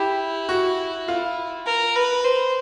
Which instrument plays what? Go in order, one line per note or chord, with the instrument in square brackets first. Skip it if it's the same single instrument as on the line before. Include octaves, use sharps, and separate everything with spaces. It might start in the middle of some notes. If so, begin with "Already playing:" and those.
Already playing: [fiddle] E4 [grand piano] G4
[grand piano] F#4
F4
[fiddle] A#4
B4
C5